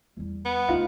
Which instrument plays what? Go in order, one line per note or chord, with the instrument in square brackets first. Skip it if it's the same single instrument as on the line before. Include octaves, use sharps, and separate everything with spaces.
[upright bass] E2 G3
[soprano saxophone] B3
[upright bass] D2 [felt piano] D#4 F4 F5